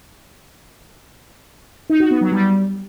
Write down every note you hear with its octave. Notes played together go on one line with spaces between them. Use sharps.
D#4
F#4
B3
F#3
G3